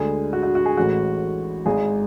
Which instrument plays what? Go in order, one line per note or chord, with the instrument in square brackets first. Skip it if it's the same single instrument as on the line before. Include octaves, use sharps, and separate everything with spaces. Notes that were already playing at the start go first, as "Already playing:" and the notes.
Already playing: [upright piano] D2 D3 G#3 G#4
F#4
F#4
F#4
G#4
A1 A2 G#3 F#4
G#1 G#2 G#3 G#4